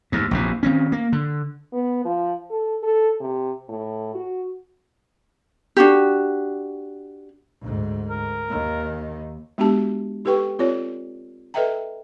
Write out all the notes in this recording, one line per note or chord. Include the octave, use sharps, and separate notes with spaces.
D#2 G#2
A#1 E2 C3
D#3 C4 C#4
A#3
D3
B3
F3
A4
A4
C3
A2
F#4
D4 F#4 G4
D2 G#2
A#4
D#2 D#3
G#3 B3 D4 F#4 G4 A5
D#4 G4 A4 B4 G5 C#6
C4 F4 A4 C#5 D5
A4 B4 D#5 E5 G5 A#5